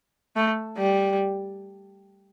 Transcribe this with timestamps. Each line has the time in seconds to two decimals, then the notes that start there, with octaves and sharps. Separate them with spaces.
0.36 A3
0.77 G3